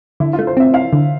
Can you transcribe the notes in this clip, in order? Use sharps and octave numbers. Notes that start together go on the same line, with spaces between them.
D3 E4
F4
A3
C5
C4 E5
E4 F5
D3